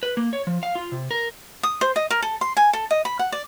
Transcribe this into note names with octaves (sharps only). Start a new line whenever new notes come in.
B4
A#3
C#5
F3
F5
F4
C3
A#4
D#6
C5
D#5
A#4
A4
C6
G#5
A4
D#5
B5
F#5
D5